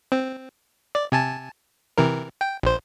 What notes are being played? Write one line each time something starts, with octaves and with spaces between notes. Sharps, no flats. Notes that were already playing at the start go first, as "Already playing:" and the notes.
C4
D5
C3 G#5 A5
C3 E3 A#4
G5
A#1 C5